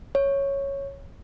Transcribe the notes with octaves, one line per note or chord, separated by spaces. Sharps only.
C#5